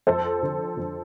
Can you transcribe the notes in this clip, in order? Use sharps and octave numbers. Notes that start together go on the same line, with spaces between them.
F2 A4 C5
D3
F2